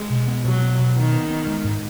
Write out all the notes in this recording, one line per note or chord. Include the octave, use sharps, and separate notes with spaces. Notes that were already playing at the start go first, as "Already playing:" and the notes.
Already playing: G#3
B2
B3
B2 F#3
B3
B2
D#3 B3
B3
B3
G#3
G#2